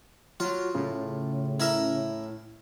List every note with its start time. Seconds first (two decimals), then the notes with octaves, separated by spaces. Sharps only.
0.40 F#3 F4
0.75 A2 C#3
1.60 E4 A#4 E5